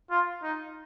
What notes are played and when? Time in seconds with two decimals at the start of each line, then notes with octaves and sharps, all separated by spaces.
0.10 F4
0.43 D#4